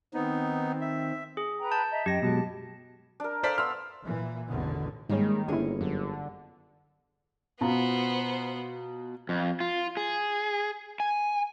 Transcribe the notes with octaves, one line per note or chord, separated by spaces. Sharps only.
D#3 B3 C4 D#4
E5
G#4
B4 G5 A#5
A5 G6
D#5 E5 A#5
F#2 G4 D#5 G5 A#6
B2 F#3 G#3 A5
D4 A#4
A4 C5 D5 F5 B6
B3 C6 E6 F6
A#2 E3
A1 E2 B2 D3 D#3 B3
G#2 D#3 G3 G#3 A#3 C#4 G#4
G1 A#3 C#4 D4 E4 G#4
F#2 D3
B2 B3 F4 C5 A#5
F2
F4
G#4
G#5